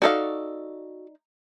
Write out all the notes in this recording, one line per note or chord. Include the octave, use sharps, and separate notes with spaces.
D#4 F#4 A4 D5 F5